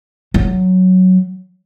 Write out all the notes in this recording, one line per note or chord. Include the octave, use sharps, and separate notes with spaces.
F#3